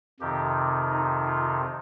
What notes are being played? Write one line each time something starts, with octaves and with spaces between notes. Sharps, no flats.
F2 C3 D#3 G4
D#4
F4